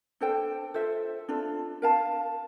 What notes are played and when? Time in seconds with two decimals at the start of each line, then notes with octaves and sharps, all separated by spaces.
0.21 D4 A4 C5 G5
0.74 F4 A4 C5 E5
1.29 D4 F4 A4
1.82 A#4 F5 A5